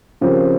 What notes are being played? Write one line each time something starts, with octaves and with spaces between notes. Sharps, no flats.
C#3 F3 C4 G4 A#4